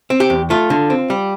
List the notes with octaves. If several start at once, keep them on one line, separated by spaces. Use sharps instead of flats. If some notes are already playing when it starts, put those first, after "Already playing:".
C4
G4
E2
A3 F4
D3
C4
G3